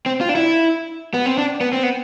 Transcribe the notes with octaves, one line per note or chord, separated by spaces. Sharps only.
C4
F4
D4
E4
B3
C4
D4
B3
C4
B3